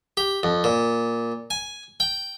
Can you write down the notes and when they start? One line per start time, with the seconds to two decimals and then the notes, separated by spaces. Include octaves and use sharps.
0.17 G4
0.43 F2
0.64 A#2
1.50 G#5
2.00 G5